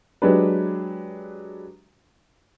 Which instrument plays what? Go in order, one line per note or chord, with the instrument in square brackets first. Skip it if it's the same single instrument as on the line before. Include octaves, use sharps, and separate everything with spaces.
[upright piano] F#3 G#3 D4 G4 B4